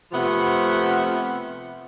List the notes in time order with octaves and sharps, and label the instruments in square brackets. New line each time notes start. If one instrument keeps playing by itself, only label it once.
[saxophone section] C3 F3 A3 B3 F#5